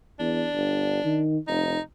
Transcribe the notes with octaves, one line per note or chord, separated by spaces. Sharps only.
E2 D4
G1
D#3
F1 D#4